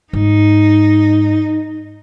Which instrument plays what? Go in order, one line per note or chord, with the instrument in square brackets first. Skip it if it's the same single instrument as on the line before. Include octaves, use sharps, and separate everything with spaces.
[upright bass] G#2 [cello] D#4